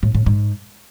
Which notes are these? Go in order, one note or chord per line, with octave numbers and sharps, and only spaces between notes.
A2
A2
G#2